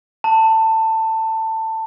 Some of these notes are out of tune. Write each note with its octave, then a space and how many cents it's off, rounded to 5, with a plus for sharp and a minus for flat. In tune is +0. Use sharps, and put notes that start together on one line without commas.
A5 +20